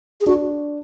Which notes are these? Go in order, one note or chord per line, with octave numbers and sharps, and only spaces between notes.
G#4
D4 F#4